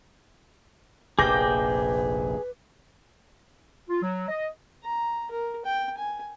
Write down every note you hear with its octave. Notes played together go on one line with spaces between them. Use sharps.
F1 A#1 G#4 B4 G5 D6 G6 A#6
F4
F#3
D#5
A#5
A#4
G5
G#5